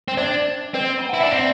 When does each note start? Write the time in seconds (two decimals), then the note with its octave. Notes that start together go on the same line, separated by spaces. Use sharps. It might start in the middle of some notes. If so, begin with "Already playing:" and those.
0.08 C4
0.17 D4 C5
0.74 C4 B4
0.98 G5
1.09 E4 F#5
1.20 D4 E5
1.31 C4 D5